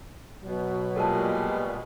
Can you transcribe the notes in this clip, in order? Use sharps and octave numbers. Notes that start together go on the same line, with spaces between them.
B2 F#3
A#2 G3 G#3 A4 A#4 A5